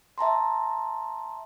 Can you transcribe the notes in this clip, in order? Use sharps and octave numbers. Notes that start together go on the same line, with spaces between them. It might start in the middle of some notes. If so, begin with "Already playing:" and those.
E5 A5 A#5 C6